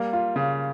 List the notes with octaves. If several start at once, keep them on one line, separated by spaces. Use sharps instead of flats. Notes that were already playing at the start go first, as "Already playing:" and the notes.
Already playing: G3 A#3
F4
C#3